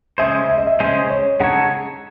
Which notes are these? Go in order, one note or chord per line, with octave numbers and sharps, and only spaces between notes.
C#3 G#3 C#4 G#4 C5 E5
E5
D#5
E5
C#3 G#3 C#4 G#4 C5 D#5
C#5
C#3 G#3 D#4 A4 C#5 F#5